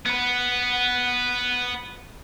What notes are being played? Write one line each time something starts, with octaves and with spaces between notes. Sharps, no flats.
B3 B4